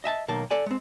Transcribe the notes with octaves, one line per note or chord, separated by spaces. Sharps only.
D#5 E5 G#5 A5
B1 D#3 A#3 A5
A4 D5 G#5
G#3 C4